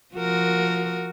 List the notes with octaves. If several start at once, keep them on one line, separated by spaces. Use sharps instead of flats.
F3 F#4 A#4